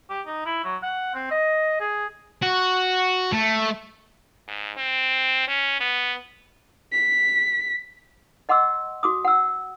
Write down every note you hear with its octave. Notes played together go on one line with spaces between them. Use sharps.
G4
D#4
E4
F#3
F#5
C4
D#5
G#4
F#4
A3
G#2
C4
C#4
B3
B6
D#5 F#5 C6 D6 E6
F#4 D6 D#6
F#5 E6